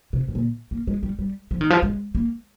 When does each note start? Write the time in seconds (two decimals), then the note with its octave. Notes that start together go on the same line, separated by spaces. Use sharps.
0.13 C3
0.28 G#2
0.35 A#2
0.71 A#3
0.87 G#3
1.03 G3
1.19 G3
1.51 F3
1.61 D#3
1.70 F3
1.82 G#3
2.15 A#3